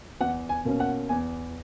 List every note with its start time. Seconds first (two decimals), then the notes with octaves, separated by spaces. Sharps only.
0.21 E2 F#5
0.49 G#5
0.65 B2 A#3 C#4
0.80 F#5
1.09 E2 G#5